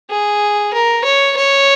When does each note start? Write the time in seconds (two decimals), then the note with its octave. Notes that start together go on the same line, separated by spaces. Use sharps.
0.10 G#4
0.73 A#4
1.05 C#5
1.37 C#5